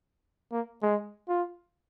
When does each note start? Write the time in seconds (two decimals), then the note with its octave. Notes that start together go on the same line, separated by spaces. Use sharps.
0.52 A#3
0.82 G#3
1.28 F4